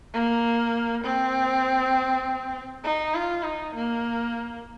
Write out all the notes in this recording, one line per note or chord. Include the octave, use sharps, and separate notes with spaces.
A#3
C4
D#4
F4
D#4
A#3